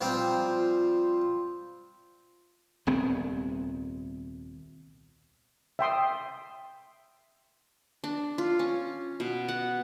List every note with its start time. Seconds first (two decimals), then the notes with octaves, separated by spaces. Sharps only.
0.01 A#2 F3 G3 C4
0.48 F4
2.87 D#1 C2 B3 C4
5.79 E5 G5 C6 D#6
8.04 D4
8.38 F4
8.59 C#4
9.20 B2
9.48 F#5